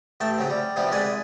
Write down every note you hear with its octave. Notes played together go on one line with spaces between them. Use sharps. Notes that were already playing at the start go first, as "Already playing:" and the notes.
A1 A3 G5 A5
C#3 F#3 C4
G3
C3 F3 G3 B3
C2 G#3 B4 D5 G#5